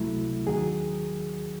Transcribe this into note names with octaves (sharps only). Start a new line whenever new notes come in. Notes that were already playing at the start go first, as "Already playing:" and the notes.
Already playing: C#2 C3 F#3 A3 E4
D#2 D#3 F#3 G#4